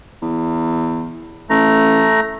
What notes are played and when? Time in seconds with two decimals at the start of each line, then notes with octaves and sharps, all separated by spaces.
0.22 E2
1.50 A1 A3 A#5